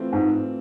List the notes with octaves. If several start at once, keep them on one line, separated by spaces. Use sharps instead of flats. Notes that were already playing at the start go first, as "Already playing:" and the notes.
Already playing: E3 A3 C4 F4
G#2